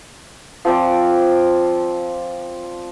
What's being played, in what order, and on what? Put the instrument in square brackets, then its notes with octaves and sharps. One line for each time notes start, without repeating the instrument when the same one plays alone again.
[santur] F3 C4 D5